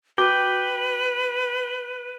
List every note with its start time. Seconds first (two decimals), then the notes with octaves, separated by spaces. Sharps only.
0.18 F#4 B4 G5 D6